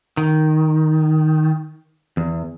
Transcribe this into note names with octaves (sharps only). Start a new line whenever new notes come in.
D#3
E2